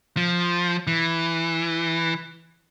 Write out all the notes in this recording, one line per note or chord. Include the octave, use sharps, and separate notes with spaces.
F3
E3